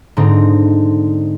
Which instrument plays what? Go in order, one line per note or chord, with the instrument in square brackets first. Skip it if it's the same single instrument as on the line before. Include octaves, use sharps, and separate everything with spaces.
[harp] G#2 D3 C4 D#4